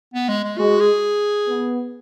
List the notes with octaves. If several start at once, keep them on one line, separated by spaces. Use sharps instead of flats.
B3
G#3
G#3
G#3 F#4
G#4
B3